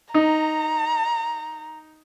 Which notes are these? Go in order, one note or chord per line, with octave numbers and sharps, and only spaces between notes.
D#4 A#5